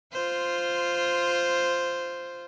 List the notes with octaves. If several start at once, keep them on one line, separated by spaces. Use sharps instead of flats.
F4 C5